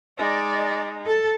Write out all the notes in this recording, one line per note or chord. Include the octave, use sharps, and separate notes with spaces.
G#3 D#4 D5
A4